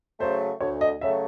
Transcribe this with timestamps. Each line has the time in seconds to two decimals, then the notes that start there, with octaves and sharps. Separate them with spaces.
0.20 C#3 F#3 A3 C5
0.60 D2 C#5
0.81 D#5
1.01 C#3 F#3 A3 E5